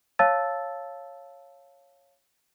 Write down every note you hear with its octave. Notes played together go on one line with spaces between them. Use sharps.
C#5 F5 A5 E6 A6